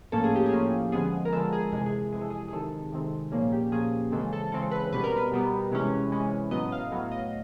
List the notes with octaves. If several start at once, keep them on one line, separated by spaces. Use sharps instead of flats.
A2 F3 A#3 C#4 A4
G#4
G4
G#4
A2 F3 A#3 C#4
D3 F3 G#3 B3 G#4
A#4
D3 F3 G#3 B3 A4
G#4
F2 C3 E3 G#3 G#4
G#4
F2 C3 E3 G#3 G#4
A4
G#4
G#4
C3 D#3 G#3 C4 A4
C3 D#3 G#3 C4
A#2 F3 A#3 C#4 G#4
G4
A#2 F3 A#3 C#4 G#4
C#3 E3 G#3 C4 A4
A4
C#3 E3 G#3 C4 A4
B4
B2 G3 B3 B4
A#4
B4
B2 G3 B3
C3 E3 G#3 C#4
C3 E3 G#3 C#4
A2 F#3 B3 D#5
F5
A2 F#3 B3
D#5